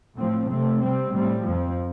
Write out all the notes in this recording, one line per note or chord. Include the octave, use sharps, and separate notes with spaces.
A2 F3 C4
C3 A3 C4
C3 G3 C4
A2 G3 C4
F2 F3 C4